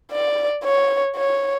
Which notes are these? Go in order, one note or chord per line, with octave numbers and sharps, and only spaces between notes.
D5
C#5
C#5